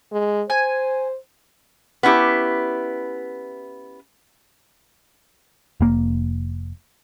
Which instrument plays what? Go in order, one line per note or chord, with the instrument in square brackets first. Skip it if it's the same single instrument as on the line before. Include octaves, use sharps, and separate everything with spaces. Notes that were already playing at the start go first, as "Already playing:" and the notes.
[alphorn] G#3
[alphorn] C5 [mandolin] G#5
[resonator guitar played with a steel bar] B3 C#4 E4 G4
[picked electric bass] F1 A#3